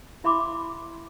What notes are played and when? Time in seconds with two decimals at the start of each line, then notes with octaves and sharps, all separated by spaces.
0.24 E4 E5 B5 C6 D6